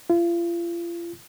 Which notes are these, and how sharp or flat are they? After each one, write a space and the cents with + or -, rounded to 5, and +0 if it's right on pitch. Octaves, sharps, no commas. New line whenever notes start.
F4 -40